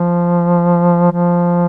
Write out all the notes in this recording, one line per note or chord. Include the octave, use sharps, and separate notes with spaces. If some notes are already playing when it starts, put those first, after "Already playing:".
Already playing: F3
F3